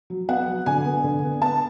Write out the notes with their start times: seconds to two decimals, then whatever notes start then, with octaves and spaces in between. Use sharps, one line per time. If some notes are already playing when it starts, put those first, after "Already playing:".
0.10 F#3
0.28 B3 F#5
0.48 F#3
0.66 D3 G#5
0.85 B3
1.04 D3
1.23 B3
1.41 B3 A5